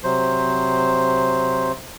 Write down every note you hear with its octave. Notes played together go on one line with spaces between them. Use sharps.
C3 F#3 C5